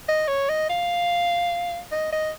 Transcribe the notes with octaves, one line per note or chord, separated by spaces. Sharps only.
D#5
C#5
D#5
F5
D#5
D#5